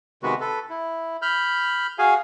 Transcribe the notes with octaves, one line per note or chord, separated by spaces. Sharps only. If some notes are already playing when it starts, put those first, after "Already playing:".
C3 D#3 G#3 B3 F#4 B4
A4 B4
E4
B5 F6 G6
F#4 G#4 F5 G#5